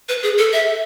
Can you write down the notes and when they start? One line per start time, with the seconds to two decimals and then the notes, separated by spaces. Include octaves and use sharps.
0.09 B4
0.23 G#4
0.38 A4
0.53 E5